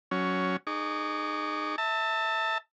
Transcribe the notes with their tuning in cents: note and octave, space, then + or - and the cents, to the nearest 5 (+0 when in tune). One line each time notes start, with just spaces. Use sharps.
F#3 +0 C#4 +10
D#4 -25 G#4 +0 C#6 +40
E5 -15 A5 +25